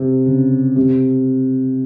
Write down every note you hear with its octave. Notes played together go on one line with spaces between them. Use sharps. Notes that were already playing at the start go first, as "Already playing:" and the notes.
Already playing: C3
C#3
C3